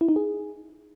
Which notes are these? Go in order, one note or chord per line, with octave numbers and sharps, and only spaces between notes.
E4
D#4
G#4